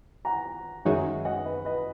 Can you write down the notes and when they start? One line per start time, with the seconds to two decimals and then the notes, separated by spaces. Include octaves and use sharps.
0.25 F#5 A#5
0.85 F#2 D#3 G#3 D#4 F#4 C#5 E5
1.25 D#5 F#5
1.45 B4 D#5
1.65 B4 D#5